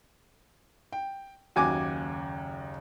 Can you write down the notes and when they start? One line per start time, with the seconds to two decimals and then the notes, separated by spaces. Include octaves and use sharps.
0.92 G5
1.56 F#1 D#2 C#3 F#4 G#5 D6